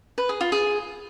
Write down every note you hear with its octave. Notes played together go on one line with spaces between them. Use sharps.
B4
G#4
F4
G#4